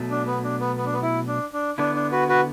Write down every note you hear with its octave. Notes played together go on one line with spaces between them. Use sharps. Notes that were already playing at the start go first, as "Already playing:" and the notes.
Already playing: B2 F#3 A3
D4
B3
D4
B3
B3
D4
B3
E4
D4
D4
D3 B3 D4 E4
D4
F#4 B4
F#4 B4